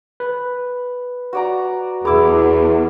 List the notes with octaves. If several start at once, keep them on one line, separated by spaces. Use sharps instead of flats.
B4
F#4 D5 A#5
E2 B3 E4 G#4 D6